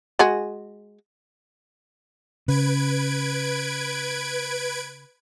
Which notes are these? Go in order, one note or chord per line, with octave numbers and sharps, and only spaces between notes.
G#3 F#4 G#4
C#3 B4 G#6 D7